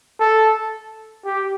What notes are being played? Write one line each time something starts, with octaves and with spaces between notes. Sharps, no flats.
A4
G4